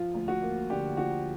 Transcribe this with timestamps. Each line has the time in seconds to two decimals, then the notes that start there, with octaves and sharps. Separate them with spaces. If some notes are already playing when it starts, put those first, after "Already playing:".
Already playing: F3 F4
0.14 D2
0.28 F#4
0.42 A#3
0.70 D3 G4
0.97 F3 F#4